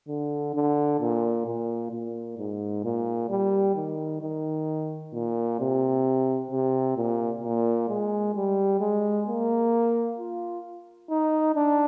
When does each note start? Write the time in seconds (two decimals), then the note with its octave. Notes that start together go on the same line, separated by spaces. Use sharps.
0.08 D3
0.54 D3
1.00 A#2
1.47 A#2
1.92 A#2
2.38 G#2
2.84 A#2
3.30 G3
3.76 D#3
4.22 D#3
5.13 A#2
5.60 C3
6.51 C3
6.97 A#2
7.43 A#2
7.89 G#3
8.35 G3
8.80 G#3
9.27 A#3
10.18 F4
11.10 D#4
11.55 D4